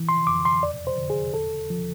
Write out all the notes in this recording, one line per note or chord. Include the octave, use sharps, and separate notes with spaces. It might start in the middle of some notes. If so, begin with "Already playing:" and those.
Already playing: E3
C6
F2 D6
C6
E2 D5
C5
D3
G#4
E2 A4
F3